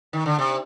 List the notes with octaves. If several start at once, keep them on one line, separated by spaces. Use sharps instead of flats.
D#3
D3
C3